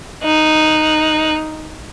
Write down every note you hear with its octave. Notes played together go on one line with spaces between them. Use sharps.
D#4 F#6